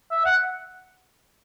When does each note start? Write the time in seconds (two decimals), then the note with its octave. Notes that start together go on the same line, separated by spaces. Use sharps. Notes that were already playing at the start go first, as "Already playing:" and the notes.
0.11 E5
0.25 F#5